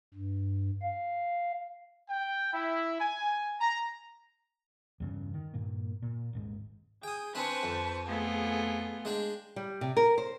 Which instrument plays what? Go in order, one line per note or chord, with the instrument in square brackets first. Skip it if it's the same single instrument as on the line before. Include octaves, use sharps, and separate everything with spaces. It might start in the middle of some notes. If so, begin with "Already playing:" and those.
[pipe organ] G2
F5
[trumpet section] G5
E4
G#5
A#5
[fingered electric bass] E2 G2 C#3
D#3
G2 A#2 A#3
A#2
D#1 G#1 G#2
[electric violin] G#4 [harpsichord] G5 D#6
[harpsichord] C4 D4 G#5 [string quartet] B4 C#6 [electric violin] C5 A5
[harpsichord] F2
[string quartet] A3 B3 F4 [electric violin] G#4
[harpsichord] G#3 D4 G5
[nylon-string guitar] G3
C3
A#4
C5